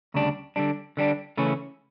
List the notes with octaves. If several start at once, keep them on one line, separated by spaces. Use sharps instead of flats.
D2 C#3 G3 D4
D3 G3 D4
D3 G3 D4
C#3 E3 A3 C#4 E4